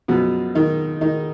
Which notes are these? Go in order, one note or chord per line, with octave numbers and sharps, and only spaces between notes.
F#2 B2 F3 B3
D#3 D#4
D#3 D#4